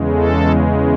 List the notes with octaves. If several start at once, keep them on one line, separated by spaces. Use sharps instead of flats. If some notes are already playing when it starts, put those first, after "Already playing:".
Already playing: E2 C#3 G#3
A4